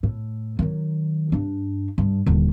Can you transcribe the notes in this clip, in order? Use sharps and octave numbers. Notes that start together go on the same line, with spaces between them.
A2
D#3 F#3
G2 D4
G2
D#1 D3